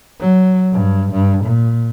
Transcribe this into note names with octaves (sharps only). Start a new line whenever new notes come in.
F#3
G2
G2
A#2